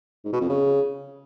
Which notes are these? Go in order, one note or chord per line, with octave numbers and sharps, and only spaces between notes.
G#2
B2
F2
C#3